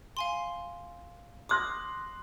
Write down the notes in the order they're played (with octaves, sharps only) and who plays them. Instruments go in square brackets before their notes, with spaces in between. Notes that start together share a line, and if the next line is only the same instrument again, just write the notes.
[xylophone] F5 G#5 C6
[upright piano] C6 F#6 A#6 [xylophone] D6 D#6